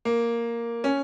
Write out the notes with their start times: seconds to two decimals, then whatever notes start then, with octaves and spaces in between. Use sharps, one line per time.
0.05 A#3
0.84 C#4